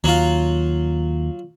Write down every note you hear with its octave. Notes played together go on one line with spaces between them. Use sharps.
D#2 F#3 F4